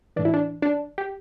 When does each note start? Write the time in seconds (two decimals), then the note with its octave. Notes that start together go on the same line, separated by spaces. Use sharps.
0.16 A2 E3 D4
0.25 E4
0.34 D4
0.62 D4
0.98 G4